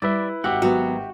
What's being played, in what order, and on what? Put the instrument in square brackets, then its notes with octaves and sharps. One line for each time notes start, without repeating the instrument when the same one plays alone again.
[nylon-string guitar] G3 [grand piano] E4 B4 [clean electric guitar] D5 E5
[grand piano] G#1 [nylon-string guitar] F#4 [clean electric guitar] G4 E5 F#5
[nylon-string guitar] F#3 B3 [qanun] F#4